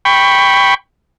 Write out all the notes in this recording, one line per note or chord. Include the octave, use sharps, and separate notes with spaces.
G5 B5 C#6